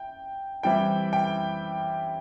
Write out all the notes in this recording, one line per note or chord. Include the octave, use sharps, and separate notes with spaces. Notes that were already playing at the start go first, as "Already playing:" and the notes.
Already playing: E4 G5
E3 G3 C4 E4 G5
G5